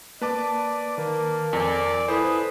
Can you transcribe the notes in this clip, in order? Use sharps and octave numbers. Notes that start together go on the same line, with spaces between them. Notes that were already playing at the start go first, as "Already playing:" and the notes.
A#3 B4 D5 A5 D6
D#3 A#3 A#4
F2 D5 G#5
E4 A4 B4 C5 G#5 D#6